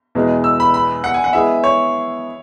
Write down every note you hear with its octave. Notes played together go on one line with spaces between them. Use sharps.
E2 B2 G#3
E6
B5
B5
F#5
G#5
F#5
G#3 B3 E4 G#4 E5
C#5